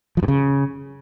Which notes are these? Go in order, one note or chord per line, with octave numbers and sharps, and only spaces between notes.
F3
G2
C#3